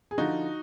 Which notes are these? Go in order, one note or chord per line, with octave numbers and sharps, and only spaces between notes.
G#4
D3 F3 D#4 F#4